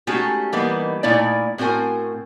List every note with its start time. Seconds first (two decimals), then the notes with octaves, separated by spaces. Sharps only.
0.07 G#3 A3 C#4 D#4 F#4 G4
0.53 E3 G3 A#3 B3 D#4
1.03 A#2 A3 D#4 E4 D5
1.58 A2 C4 F#4 A#4 G#5